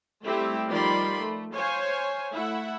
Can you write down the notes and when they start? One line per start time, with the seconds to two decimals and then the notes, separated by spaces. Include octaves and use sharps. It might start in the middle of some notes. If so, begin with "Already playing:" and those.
0.25 G3 A3 C4 E4 G4
0.70 D#3 F3 G3 D5 B5 C6
1.21 A3
1.55 C5 C#5 F5 G#5
2.31 A3 E4 E5 F#5